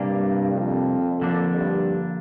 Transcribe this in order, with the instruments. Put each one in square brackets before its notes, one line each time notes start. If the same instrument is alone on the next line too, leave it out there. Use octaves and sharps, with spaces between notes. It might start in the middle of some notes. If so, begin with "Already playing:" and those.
Already playing: [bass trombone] G2 [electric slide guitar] C3 G3 A#3 D4
[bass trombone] F2
[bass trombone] F2 [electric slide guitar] D3 F3 A#3 D4
[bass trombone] G2